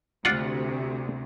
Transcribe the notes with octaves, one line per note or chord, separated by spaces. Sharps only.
D2 C3 D4 F4 F#5